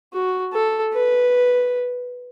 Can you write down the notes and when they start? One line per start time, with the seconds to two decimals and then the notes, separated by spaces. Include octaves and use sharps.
0.13 F#4
0.53 A4
0.93 B4